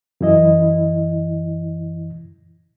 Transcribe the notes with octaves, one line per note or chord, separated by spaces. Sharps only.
F#2 E3 E4 D#5